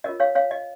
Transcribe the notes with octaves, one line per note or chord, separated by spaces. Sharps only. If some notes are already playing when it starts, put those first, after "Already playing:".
F4 A#4 C#5 D#5
C#5 F5
C#5 F5
D#5